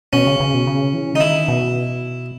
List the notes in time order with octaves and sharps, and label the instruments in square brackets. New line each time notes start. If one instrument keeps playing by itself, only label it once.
[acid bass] B2 [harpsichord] C#4
[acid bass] C#3
C#3
B2
C#3
E3
[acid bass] C#3 [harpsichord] D#4
[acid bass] D#3 [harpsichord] E4
[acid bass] B2